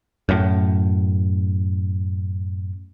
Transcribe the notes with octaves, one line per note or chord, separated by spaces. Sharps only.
F#2 A2